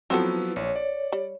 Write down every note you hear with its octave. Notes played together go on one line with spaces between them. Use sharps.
F3 F#3 B3 C4 E4 F#4 A4 B4
A#1 C#5
D5
G3